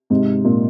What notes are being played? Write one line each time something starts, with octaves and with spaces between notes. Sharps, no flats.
G#2 C3
A#2